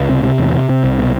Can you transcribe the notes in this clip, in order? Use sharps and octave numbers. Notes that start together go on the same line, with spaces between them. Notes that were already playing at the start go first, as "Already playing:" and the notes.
Already playing: C#2
C3
C3
E2
C3
C3
C2
B2